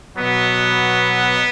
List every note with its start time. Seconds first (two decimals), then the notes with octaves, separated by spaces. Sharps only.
0.16 B2 F#3 B3